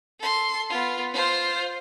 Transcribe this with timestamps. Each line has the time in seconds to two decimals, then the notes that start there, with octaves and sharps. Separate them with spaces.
0.20 A4 C6
0.70 B3 F4
1.13 F4 C5